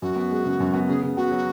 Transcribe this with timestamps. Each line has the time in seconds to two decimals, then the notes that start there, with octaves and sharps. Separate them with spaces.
0.02 F#2 F#4
0.16 B3
0.31 G#3
0.45 C#3
0.60 F#2
0.74 B3
0.88 C#3 G#4
1.03 C#3
1.17 B3 F#4
1.31 F#3